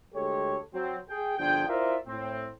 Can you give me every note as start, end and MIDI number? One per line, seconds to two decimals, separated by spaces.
0.14 0.58 38
0.14 0.58 56
0.14 0.58 67
0.14 0.58 69
0.14 0.58 73
0.74 0.97 54
0.74 0.97 60
1.08 1.35 68
1.08 1.35 79
1.38 1.63 31
1.38 1.63 50
1.38 1.63 53
1.38 1.63 62
1.38 1.63 68
1.38 1.63 79
1.68 1.97 64
1.68 1.97 65
1.68 1.97 70
1.68 1.97 72
1.68 1.97 74
1.68 1.97 76
2.07 2.48 45
2.07 2.48 60